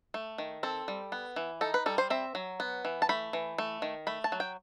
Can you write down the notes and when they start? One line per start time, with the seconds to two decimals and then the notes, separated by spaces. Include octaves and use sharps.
0.14 A3
0.38 D#3
0.63 C4 A4
0.88 G3
1.12 B3
1.36 E3
1.61 D#4 A4
1.74 B4
1.86 G3 A4
1.98 C5
2.10 C4 E5
2.35 F#3
2.60 B3
2.85 E3
3.02 A5
3.09 A3 B5
3.33 E3
3.58 A3
3.82 D#3
4.07 A3 B5
4.24 A5
4.32 F#3
4.40 G5